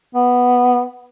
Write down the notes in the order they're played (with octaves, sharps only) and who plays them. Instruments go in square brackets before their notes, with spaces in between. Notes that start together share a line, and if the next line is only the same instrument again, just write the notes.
[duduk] B3